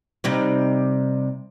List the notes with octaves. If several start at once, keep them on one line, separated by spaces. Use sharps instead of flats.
C3 G3 D#4